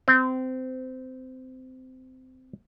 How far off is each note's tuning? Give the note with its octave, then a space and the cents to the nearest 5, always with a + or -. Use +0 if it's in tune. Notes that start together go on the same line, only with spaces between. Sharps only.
C4 -20